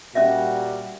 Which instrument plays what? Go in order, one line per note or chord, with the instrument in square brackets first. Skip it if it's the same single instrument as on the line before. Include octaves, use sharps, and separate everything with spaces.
[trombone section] A#2 G3 F#4 [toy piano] C#4 D#5 E5